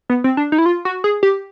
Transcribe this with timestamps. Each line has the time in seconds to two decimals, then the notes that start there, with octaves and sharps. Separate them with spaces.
0.10 B3
0.24 C4
0.37 D4
0.52 D#4
0.58 E4
0.66 F4
0.85 F#4
1.04 G#4
1.23 G4